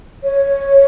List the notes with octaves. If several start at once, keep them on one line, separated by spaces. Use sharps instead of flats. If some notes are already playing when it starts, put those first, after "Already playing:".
C#5